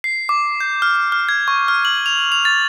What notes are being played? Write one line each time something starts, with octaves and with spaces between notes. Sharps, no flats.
C7
D6
G6
F6
F6
G#6
C#6
F6
F#7
F7
F7
A6